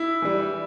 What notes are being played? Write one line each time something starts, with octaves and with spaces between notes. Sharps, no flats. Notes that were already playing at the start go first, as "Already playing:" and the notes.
Already playing: E4
E3 G3